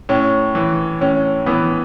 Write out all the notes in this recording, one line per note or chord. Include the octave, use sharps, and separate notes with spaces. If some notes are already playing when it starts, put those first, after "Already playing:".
A2 C#4
E3
A2 C#4
E3 B3